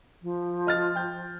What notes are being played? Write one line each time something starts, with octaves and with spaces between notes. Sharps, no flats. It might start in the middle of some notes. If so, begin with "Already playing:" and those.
F3
D#5 F6 A6
G5 G6